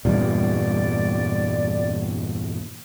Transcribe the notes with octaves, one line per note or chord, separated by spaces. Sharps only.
E2 G2 A#2 D5